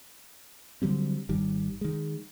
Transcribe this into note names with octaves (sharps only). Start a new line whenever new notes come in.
D3 F#3 G3 C4
G#1 D#3 G3
D#3 G#3